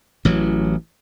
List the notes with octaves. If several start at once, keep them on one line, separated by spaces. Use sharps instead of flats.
A1 E3 F#3